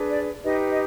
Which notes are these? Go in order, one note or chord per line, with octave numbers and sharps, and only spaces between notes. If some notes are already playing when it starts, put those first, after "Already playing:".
Already playing: D4 G#4 B4
D5
D#4 G4 B4 D#5
D#5